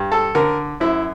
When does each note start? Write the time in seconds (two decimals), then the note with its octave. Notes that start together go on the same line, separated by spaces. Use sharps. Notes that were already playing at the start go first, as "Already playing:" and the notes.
Already playing: G2
0.12 A4
0.35 D3 A#4
0.80 F#2 E4